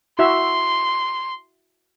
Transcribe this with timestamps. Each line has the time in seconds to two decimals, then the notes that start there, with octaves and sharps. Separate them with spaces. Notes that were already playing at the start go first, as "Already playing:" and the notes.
0.19 E4 F#4 E5 C6